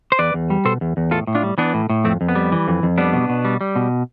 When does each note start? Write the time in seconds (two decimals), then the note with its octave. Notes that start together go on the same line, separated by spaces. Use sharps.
0.12 C5
0.19 E2 B4 D5
0.34 E2
0.50 G3
0.65 B2 A4 C5
0.81 E2
0.97 E2
1.11 A2 F4 A4
1.27 A2
1.35 D4 F4
1.43 G3
1.58 E3 B3 D4
1.74 A2
1.89 A2
2.04 F2 A3 C4
2.21 F2
2.29 B3
2.35 G3
2.52 E3
2.68 F2
2.83 F2
2.98 G3 B3 D4
3.13 B2
3.29 B2
3.45 G3
3.61 G3
3.76 B2